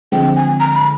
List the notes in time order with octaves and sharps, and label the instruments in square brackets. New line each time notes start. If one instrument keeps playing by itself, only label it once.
[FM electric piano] D3 F3 G#3 C4 [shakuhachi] G5
[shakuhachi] G#5
A#5
B5